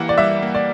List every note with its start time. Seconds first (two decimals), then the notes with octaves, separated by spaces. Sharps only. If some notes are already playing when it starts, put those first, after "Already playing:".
Already playing: E3 G3 A#3 F#5
0.09 D5
0.18 G3 E5
0.42 A#3
0.55 D5